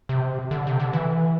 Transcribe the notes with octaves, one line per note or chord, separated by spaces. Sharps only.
C3
D3
C3
D3
E3